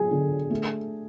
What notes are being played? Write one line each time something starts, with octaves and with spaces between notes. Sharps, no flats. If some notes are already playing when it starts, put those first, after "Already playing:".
Already playing: F#3 G#4 G#5
D3
A3